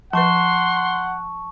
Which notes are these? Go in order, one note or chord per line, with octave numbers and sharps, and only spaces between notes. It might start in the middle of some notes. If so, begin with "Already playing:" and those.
F3 B4 F#5 A5 C6 C#6